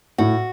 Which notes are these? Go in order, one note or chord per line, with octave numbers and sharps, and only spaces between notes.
A2 F#4